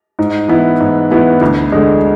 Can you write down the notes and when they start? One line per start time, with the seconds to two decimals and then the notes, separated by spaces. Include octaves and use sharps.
0.19 G#2
0.48 E3 B3 E4
0.80 G#2
1.11 E3 B3 E4
1.41 D2
1.72 D3 G#3